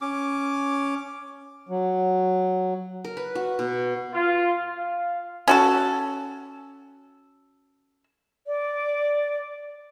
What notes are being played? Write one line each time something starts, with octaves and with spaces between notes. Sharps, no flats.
C#4 D6
F#3
A#4
B4
F#4
B2
F4
F5
C#4 F#4 A4
D5